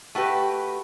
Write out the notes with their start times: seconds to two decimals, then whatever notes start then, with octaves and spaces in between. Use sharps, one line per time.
0.15 A3 F#4 G4 B4